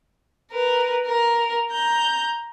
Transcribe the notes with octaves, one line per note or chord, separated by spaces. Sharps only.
A#4 B4
A#4
A#5 G6